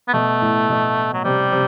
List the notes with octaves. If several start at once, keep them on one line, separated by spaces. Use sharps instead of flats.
B3
B2 A3
A2
B2
F#3
C3 G3
C3